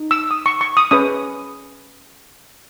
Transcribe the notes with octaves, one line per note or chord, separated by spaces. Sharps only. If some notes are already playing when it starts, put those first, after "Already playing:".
Already playing: D#4
E6
D#6
C#6
C#6
D#6
C#4 G#4 B4 D#6